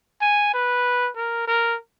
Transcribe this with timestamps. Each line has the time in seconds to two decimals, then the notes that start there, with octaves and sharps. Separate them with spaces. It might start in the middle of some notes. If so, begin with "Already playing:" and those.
0.21 G#5
0.54 B4
1.16 A#4
1.48 A#4